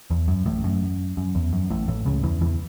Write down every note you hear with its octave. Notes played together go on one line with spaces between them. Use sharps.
E2
F#2
A1 A2
F#2
F#2
E2
F#2
A1 A2
A1 A2
C#2 C#3
E2 E3
E2 E3